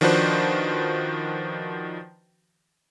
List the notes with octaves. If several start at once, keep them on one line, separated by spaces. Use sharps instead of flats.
D#3 F3 D4 F#4 B4 C5